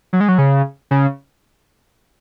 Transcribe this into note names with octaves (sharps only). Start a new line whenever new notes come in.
F#3
G#3
F#3
C#3
C#3